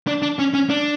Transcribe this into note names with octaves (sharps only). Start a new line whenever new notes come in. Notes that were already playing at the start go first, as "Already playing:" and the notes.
D4
D4
C#4
C#4
D4